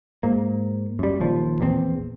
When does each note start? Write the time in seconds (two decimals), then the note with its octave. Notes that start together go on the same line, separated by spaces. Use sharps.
0.23 G#2 A#3
0.99 F#2 G3
1.20 D#1 D#2 F3
1.60 A#1 E2 F3 C4